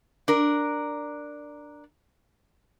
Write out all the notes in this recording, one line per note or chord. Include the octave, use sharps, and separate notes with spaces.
D4 A#4